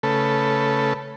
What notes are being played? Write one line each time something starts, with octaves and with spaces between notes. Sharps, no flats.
C#3 A3 A4 B4